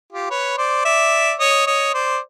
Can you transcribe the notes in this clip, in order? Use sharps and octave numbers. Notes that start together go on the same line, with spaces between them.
F4 G4
B4 C#5
C5 D5
D5 E5
C#5 D#5
C#5 D#5
C5 D5